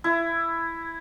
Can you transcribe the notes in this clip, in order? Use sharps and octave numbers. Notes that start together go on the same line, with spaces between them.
E4